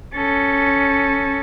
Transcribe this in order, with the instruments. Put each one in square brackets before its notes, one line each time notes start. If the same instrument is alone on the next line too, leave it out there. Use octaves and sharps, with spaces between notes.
[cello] C#4 A4